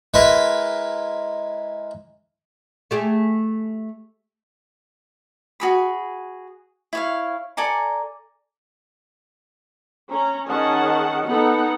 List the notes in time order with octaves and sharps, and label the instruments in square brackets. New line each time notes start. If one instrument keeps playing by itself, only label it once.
[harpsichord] G#3 E4 A#4 B4
[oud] A3 G4 G#4
[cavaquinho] F#4 G#4 B5
E4 C#5 F5
A4 D5 G#5 A#5
[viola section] C#4 A#5
D#3 C#4 G#4 D#5 F#5 A5
B3 D#4 A4 F#5